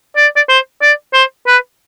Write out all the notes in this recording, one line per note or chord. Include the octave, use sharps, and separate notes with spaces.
D5
D5
C5
D5
C5
B4